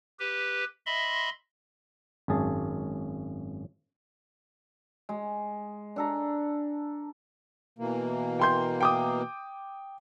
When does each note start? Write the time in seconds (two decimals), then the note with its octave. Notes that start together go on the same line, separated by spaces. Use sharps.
0.20 G4 B4
0.86 D#5 E5 B5 C6
2.28 G#1 F#2 G#4 A5
5.09 G#3
5.96 D4 A4 A#5
7.79 B2 E3 A#3
8.40 G5 C6 G6
8.81 G5 D6 D#6